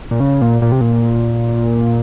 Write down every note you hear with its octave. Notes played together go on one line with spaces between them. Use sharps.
A#2
C#3
A#2
A#2
C3
A#2